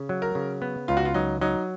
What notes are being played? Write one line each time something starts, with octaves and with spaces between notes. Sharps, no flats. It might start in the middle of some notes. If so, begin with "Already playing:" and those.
Already playing: C#3
F#3
A#4
C#3
B3
C#2 F4
F#4
F4
F#3 D#4
F#3 D#4